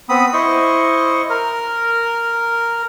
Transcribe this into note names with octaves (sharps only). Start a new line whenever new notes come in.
B3 C4 B5 D#6
E4 C5 D#5 C#6
A#4